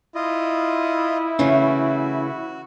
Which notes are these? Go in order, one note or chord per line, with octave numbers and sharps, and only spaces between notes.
E4 F4 D#5
C#3 E3 A3 C#4 F#4